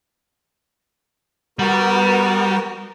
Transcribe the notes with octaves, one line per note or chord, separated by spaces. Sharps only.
G3 B3 F#4 A#4